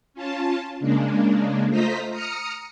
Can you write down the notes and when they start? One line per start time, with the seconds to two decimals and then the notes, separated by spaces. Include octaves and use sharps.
0.14 C#4 F4 A5
0.80 C#3 G#3 A#3 D4
1.68 A3 F4 C5 D#5 A#5 B6
2.11 A#5 D#6 F6 C#7